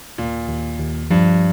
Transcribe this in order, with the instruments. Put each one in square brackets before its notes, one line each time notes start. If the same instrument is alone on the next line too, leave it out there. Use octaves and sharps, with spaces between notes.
[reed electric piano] D#2 [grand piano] A#2
[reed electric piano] D#2
D#2
[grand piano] G2 [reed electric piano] F3